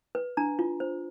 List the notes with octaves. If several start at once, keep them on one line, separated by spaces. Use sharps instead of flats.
B4
D4 A#5
F4
C5